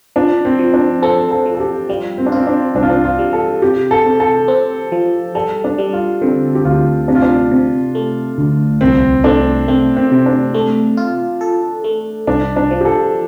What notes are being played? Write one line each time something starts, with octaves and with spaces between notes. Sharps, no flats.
F3 D4
C4
F3
D4
C4 A4
A4
F3
A4
G4
G3 F4
C4
D4
C4 F4
D4
C2 D4
F4
D4
F4
G3
A4
C3 G4
A4
C3
A4
C4
F3
G3 A4
D4
G3
F4
D3 C4
G4
D2 F4
C3 D4
F4
D4
C3
A3
D2
C2 C4
A3 D4
A3 C4
C4
C3
D4
A3
F4
A4
A3
C2 D4
D4
F3
G4
A4